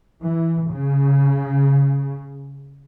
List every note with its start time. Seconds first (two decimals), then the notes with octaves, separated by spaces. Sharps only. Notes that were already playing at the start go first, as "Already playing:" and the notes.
0.24 E3
0.72 C#3